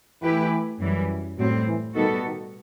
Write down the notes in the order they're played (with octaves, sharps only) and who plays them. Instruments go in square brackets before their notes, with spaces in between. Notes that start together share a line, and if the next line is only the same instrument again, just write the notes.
[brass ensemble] E3 [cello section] A3 E4 G4 B4
[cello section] F#2 E3 G3
[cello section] A2 G3 C4 [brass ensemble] F#3
[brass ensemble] E3
[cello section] B2 G3 B3 F#4 A4 [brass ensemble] D#3
[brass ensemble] D#3